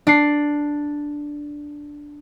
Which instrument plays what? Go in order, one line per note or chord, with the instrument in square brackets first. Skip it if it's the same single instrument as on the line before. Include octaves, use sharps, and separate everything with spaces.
[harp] D4 C7